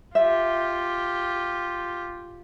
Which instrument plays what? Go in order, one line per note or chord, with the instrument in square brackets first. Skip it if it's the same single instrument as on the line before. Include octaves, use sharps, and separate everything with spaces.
[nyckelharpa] F4 G4 [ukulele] E5